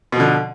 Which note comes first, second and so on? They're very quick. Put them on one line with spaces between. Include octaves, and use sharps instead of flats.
B2 F3 D3